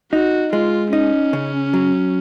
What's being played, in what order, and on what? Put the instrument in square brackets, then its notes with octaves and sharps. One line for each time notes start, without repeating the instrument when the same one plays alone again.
[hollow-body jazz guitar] D#4 [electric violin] F#4
[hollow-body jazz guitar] G#3 [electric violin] F4
[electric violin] C#4 [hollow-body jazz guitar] D#4
[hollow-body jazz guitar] C#3
F#3